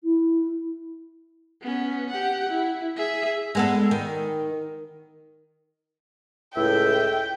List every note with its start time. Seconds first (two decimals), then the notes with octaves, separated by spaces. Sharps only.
0.03 E4
1.62 B3 C#4
2.10 G4 F#5
2.50 E4
2.96 G#4 E5
3.55 G#3 B3 A4
3.91 D#3
6.56 C#2 A2 E5 G5